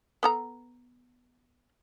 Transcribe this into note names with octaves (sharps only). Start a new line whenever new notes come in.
B3 A4 A#5